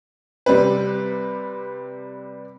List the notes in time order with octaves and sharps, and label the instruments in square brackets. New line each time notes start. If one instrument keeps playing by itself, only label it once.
[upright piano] C3 G3 C4 B4